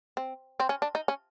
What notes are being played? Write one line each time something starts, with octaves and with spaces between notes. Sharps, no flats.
C4
C4
C#4
D4
D#4
C#4